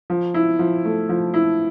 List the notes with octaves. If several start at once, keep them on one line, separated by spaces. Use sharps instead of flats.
F3
E4
F3
A3
F3
E4